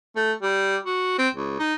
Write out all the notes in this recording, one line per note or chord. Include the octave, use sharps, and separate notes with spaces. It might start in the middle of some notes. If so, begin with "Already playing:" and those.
A3
G3
F#4
C4
C#2
D#4